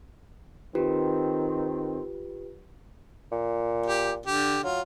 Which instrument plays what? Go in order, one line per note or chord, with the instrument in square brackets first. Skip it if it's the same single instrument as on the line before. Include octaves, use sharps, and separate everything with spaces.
[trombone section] D#3 C4 [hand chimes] F4 G4 B4
[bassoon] A#2
[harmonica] G4
D3 G4
[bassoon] F#3 [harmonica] F4